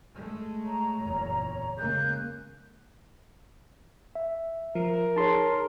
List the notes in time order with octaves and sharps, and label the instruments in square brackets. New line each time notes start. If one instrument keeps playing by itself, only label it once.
[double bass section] G#3 A3
[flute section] C#5 A#5
[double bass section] F#1 E2 A#2
[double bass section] C#3 G#3 A#3 [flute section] F#6 G6
[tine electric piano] E5
[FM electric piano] F3 [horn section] A#4
[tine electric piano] D#4 G#4 C#5 [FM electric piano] A5 C6